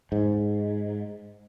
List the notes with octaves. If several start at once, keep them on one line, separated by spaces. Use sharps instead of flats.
G#2